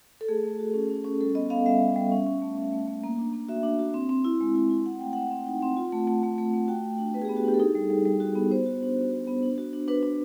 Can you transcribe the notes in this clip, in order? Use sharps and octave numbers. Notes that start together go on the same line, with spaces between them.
A4
A3 G#4
A3
F#4
C#4
C#4
C#4
G3 A4
B3 D#5
B3 F5
G3 E5
G3
G3
C#4
C#4
A3
C#4
A3
A3
A#3
D4
A#3
F#4 E5
D4
F#4
C4
C4
E4
G#3
E4
E4
C4 F#5
A3 G5
C4 F#5
C4
D#4
C4
F4
A3
A3
A3
A3
A3
F#4 G5
F#4
D4
B3 B4
G#4
G4
B3
F#4
D4 G4
A4
D#4 G#4
G3
G3
G3
F#4
B3
B3 C5
F#4
D4
F#4
F#4
B3
D4
F#4
D4
D4 B4
D4